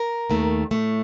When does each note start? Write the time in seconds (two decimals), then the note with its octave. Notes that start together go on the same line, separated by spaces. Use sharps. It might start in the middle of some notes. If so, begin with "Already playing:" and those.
Already playing: A#4
0.30 D#2 D#3 A3
0.71 A2 A3